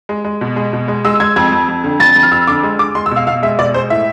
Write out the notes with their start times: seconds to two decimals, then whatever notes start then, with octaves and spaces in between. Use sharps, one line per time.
0.09 G#3
0.24 G#3
0.41 B2
0.56 G#3
0.73 B2
0.88 G#3
1.05 G#3 E6
1.20 G#3 G#6
1.36 F2 G#6
1.52 F2
1.68 F2
1.84 D3
2.00 F2 A6
2.16 F2
2.23 F6
2.32 F2 E6
2.47 D3 D6
2.63 G#3
2.79 G#3 D6
2.95 G#3 C6
3.06 E6
3.11 B2
3.16 F5
3.27 B2 F5
3.43 G#3 E5
3.59 B2 D5
3.74 G#3 C5
3.90 A2 E5